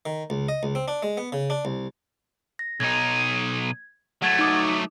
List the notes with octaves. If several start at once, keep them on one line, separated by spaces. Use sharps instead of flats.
D#3
C#2
D#5
C#2
C4
D4
G#3
B3
C#3
D4
C2
A#6
B1 D#4 G#6
F#3 A3 F#5 G#6 A6
D#4 D6 D#6